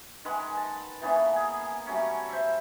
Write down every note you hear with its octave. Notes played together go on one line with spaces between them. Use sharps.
D#3 G#3 B4 F#5
A5
E3 A#3 B3 C#4
G#4
F#3 G3 A3 C#4
C5 E5